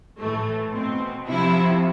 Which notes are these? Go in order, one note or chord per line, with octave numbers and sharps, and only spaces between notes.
A2 E3 A3
B2 C4
C3 F3 E4